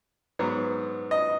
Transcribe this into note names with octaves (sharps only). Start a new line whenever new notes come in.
G#2 F#3 B3
D#5